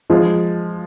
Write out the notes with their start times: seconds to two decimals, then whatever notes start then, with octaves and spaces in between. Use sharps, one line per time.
0.10 F3 G#3